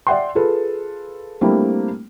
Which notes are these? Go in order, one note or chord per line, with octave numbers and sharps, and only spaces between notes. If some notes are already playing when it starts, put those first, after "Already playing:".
D5 E5 F#5 G5 C6
F4 G#4 A4 B4
G3 A3 A#3 C4 D4 E4